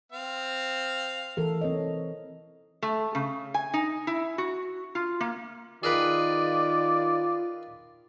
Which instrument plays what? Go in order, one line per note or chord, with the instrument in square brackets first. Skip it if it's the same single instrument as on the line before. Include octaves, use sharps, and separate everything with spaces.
[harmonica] C4 F5
[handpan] E3 A4 A#4
C4 C#5 D#5
[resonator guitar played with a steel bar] A3
C#3
G#5
D#4
E4
F#4
F4
A#3
[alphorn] D#3 [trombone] F4 [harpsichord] G#4 A#4 B4 [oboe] D5